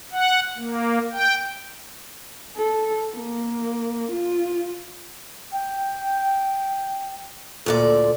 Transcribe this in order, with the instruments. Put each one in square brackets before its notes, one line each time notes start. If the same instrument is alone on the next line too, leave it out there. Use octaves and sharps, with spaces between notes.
[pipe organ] F#5
A#3
G5
[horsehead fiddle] A4
A#3
F4
[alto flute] G5
[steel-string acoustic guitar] D2 A#2 D5 [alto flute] A4